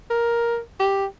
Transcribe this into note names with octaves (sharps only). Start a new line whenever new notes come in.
A#4
G4